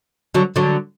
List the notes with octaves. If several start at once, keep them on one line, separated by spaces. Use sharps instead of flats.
D3 F#3
D3 F#3